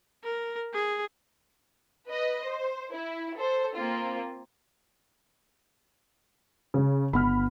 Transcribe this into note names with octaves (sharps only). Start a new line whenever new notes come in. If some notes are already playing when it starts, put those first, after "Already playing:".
A#4
G#4
B4 D#5
C5
E4
A4 C5
A#3 C4 F4
C#3
G1 B3 B5 F6